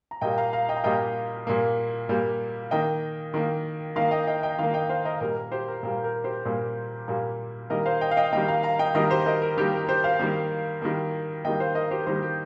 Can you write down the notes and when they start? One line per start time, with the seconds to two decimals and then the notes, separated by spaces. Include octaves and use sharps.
0.11 A#5
0.21 A#2 G3 A#3 D#5 G5
0.38 F5 A#5
0.53 F5 A#5
0.69 D#5 G5
0.77 A#5
0.84 A#2 G3 A#3 D#5 G5
1.47 A#2 G3 A#3
2.09 A#2 G3 A#3
2.71 D#3 A#3 D#5 G5
3.34 D#3 A#3
3.96 D#3 A#3 F5 A#5
4.11 D#5 G5
4.27 D#5 G5
4.43 D#5 G5
4.58 D#3 A#3 F5 A#5
4.74 D#5 G5
4.89 C5 F5
5.05 A#4 D#5
5.20 A#2 G3 A#3 A#4
5.36 A#4
5.52 G4 C5
5.68 A#4
5.83 A#2 G3 A#3 A#4
6.04 A#4
6.24 G4 C5
6.45 A#2 G3 A#3
7.08 A#2 G3 A#3
7.70 D#3 G3 A#3 A#4 D#5
7.86 C5 F5
8.01 D#5 G5
8.11 F5
8.17 D#5 G5
8.32 D#3 G3 A#3 D#5 G5
8.48 F5 A#5
8.63 F5 A#5
8.79 D#5 G5
8.95 D#3 G3 A#3 A#4 D#5
9.10 G4 C5
9.26 A#4 D#5
9.42 A#4
9.57 D#3 G3 A#3 G4
9.73 A#4
9.88 G4 C5
10.04 C5 F5
10.19 D#3 G3 A#3
10.82 D#3 G3 A#3
11.45 D#3 G3 A#3 D#5 G5
11.60 C5 F5
11.75 A#4 D#5
11.91 G4 C5
12.02 A#4
12.06 D#3 G3 A#3 G4 C5
12.22 G4